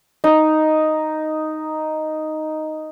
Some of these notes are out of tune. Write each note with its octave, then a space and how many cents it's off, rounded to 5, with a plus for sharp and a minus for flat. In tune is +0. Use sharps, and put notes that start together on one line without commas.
D#4 +0